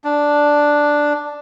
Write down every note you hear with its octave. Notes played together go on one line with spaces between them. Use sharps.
D4